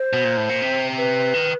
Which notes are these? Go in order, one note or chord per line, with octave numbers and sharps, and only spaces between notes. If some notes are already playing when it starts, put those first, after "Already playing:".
Already playing: C5
B2
A#2
A2
A#2
C3
B4
D#3